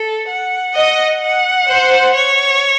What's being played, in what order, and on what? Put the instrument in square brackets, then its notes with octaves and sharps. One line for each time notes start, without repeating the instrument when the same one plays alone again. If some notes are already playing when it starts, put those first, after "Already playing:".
Already playing: [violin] A4
F#5
[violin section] D#5
[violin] F#5
[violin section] C5
[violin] C#5